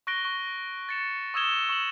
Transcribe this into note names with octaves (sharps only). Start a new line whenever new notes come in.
C#6 F#6 A#6 D7 G7
C#6
A6 C#7 E7
C#6 D#6 E6 G#6 E7 G7
C#6 E7 F#7